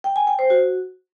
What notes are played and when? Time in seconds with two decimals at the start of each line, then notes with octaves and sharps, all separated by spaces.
0.04 G5
0.16 G#5
0.27 G5
0.39 C5
0.50 F#4